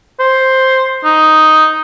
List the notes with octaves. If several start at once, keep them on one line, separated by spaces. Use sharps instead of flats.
C5
D#4